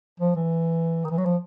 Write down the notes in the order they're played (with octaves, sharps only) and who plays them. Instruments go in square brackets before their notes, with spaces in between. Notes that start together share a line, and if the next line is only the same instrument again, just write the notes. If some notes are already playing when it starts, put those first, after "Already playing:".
[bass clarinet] F3
E3
D#3
E3
F#3
F3